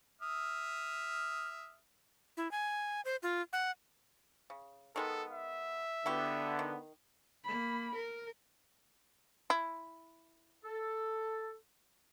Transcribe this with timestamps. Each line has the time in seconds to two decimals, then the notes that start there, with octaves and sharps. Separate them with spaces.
0.22 E5 D#6 F6
2.37 E4
2.51 G#5
3.05 C5
3.23 F4
3.53 F#5
4.50 C#3
4.96 D#3 G#3 B3 A4
5.31 E5
6.06 D3 B3 E4 F#4 G4
6.59 D#3
7.44 A#3 B5
7.95 A#4
9.50 E4
10.65 A4